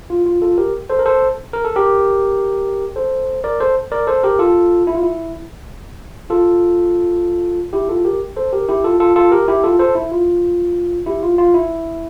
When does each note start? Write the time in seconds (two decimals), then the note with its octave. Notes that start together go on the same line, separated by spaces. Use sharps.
0.10 F4
0.26 F4
0.42 F4 A4
0.58 G4 A#4
0.90 A4 C5
0.99 A#4
1.06 A4 C5
1.53 A#4
1.65 A4
1.76 G4 A#4
2.96 A4 C5
3.44 A#4 D5
3.60 A4 C5
3.92 A#4 D5
4.07 A4 C5
4.23 G4 A#4
4.39 F4 A4
4.87 E4
4.95 F4
5.03 E4
6.30 F4 A4
7.73 E4 G4
7.89 F4 A4
8.05 G4 A#4
8.36 A4 C5
8.53 G4 A#4
8.68 E4 G4
8.84 F4 A4
9.00 F4 A4
9.16 F4 A4
9.32 G4 A#4
9.48 E4 G4
9.64 F4 A4
9.79 A4 C5
9.95 E4
10.11 F4
11.06 E4 G4
11.23 F4
11.38 F4
11.54 E4